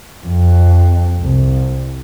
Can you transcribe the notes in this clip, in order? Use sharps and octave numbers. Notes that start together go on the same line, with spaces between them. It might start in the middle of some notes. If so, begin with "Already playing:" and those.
F2
C2